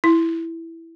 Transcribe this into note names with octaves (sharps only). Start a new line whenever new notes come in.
E4